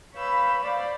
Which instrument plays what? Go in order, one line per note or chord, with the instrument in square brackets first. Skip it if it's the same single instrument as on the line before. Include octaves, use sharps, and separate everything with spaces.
[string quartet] B4 C#5 F5 B5 E6 G6
C5 D5 F5 B5